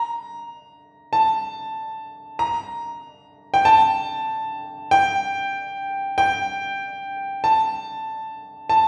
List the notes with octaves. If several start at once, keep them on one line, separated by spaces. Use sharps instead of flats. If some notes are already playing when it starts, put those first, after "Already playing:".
Already playing: A#5
A5
A#5
G5
A5
G5
G5
A5
A5